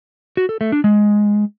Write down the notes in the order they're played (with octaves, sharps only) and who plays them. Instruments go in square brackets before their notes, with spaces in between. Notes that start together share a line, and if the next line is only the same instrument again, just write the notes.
[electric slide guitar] F#4
A4
A3
D4
G#3